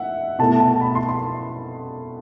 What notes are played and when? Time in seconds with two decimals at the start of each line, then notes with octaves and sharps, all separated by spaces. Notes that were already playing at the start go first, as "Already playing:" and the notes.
Already playing: E5 F#5
0.39 B2 A3 E4 A5
0.60 A5
0.81 B5
0.95 C6
1.09 C6